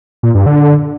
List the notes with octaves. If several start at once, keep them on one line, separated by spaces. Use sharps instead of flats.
A#2
G2
D3